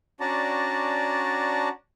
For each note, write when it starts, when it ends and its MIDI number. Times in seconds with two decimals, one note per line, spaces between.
0.20 1.69 61
0.20 1.69 62
0.20 1.69 66
0.20 1.69 74
0.20 1.69 81
0.20 1.69 82